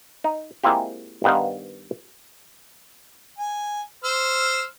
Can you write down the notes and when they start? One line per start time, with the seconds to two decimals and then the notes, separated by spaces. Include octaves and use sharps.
0.24 D#4
0.64 G#3 A#3 C4 E4 F4 G4
1.24 G2 D#3 B3 D#4 C5 F5
3.38 G#5
4.04 C5 E6 F6